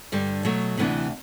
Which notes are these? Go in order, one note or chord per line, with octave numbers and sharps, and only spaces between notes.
G2 D3 G3
B2 F#3 A3
D2 C3 E3 B3 D4